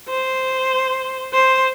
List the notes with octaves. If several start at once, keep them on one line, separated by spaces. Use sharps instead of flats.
C5
C5